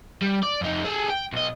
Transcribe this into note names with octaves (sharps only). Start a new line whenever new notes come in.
G3
D5
F2 D#4
G#4 A4
G5
B1 D#5